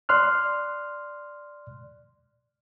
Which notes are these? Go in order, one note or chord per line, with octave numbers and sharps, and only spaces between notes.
D5 C6 F6 F#6